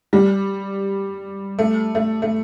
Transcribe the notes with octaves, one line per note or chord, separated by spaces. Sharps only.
G3
A3
A3
A3